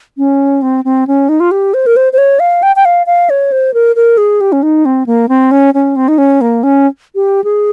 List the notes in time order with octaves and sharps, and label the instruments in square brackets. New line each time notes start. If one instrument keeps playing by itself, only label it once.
[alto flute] C#4
C4
C4
C#4
D#4
F4
G4
C5
A#4
C5
C5
C#5
F5
G5
G5
F5
F5
C#5
C5
A#4
A#4
G#4
G4
C#4
D#4
C4
A#3
C4
C#4
C#4
C4
D#4
C#4
A#3
C#4
G4
G#4